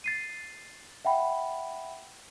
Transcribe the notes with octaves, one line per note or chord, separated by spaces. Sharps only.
A6 C7 D#7
E5 F#5 G5 B5